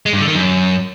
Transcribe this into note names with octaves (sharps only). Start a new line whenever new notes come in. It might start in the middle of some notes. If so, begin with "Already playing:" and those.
G#3
G2
D3
D#3
F#2